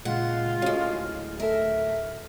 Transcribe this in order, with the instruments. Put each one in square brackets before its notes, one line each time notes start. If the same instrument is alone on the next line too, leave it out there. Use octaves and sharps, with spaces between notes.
[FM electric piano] A#2 C#3 [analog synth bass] G#3 [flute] F4 [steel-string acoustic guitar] F#5
[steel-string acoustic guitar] A2 G#3 [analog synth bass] C#4 [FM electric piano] F#4
[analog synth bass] D1 [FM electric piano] F6
[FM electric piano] A3 A4 [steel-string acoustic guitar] A#4 [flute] E5